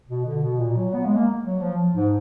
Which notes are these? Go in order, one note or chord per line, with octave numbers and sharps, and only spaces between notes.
B2
D3
B2
A#2
F#3
B3
G#3
A#3
F#3
F3
G#2